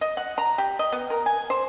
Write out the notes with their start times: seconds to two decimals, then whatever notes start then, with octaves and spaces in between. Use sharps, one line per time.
0.01 D#5
0.17 F#5
0.38 A#5
0.58 G4
0.79 D#5
0.92 B3
1.10 A#4
1.26 G#5
1.50 C5